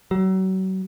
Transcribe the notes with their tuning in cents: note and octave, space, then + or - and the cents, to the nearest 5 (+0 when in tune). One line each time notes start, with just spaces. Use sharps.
F#3 +35